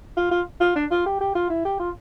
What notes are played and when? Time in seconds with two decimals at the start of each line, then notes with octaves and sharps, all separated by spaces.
0.17 F4
0.31 F4
0.60 F4
0.76 D4
0.91 F4
1.06 G4
1.20 G4
1.35 F4
1.50 E4
1.65 G4
1.79 F4